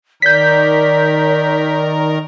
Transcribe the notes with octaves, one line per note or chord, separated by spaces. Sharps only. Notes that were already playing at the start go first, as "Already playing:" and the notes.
D#3 A#4 D5 G6 B6